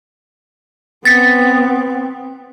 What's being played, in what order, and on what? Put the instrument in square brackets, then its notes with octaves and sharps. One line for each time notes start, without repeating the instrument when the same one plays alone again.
[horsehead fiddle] B3 C4 [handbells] A6 B6 C#7